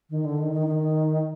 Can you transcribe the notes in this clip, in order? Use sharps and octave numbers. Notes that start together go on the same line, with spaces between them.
D#3
D3
D#3
D#3
D#3